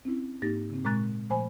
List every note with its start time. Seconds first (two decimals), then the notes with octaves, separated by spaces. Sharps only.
0.05 C4 C#4 E4
0.42 G#2 A#3 D#4 G4 A6 A#6
0.70 C#3 C4
0.85 A#2 G#3 A#5 C#6 F#6 A6
1.30 A#2 F3 A3 C5 G#5 B5